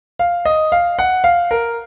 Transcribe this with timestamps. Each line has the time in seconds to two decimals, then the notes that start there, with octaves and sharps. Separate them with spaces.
0.19 F5
0.45 D#5
0.72 F5
0.99 F#5
1.24 F5
1.51 A#4